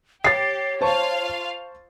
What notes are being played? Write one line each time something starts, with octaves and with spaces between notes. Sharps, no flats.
G4 C#5 A6 C7
F4 C5 F5 A5 C#6